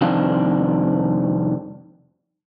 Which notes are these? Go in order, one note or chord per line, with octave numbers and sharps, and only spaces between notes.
C2 F2 D#3 C4 D4 F5